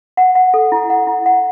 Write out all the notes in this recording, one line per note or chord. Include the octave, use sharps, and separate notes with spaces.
F#5
F#5
A4
E4
F#5
E4
F#5